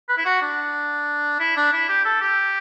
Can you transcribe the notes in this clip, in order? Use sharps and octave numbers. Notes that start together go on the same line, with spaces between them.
B4
E4
F#4
D4
E4
D4
E4
G4
A4
G4